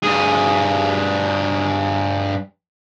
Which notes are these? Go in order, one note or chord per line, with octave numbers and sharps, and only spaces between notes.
G2 G#4